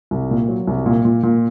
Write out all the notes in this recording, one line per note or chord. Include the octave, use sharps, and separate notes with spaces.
C2
A#2
F#3
C2
A#2
A#2
A#2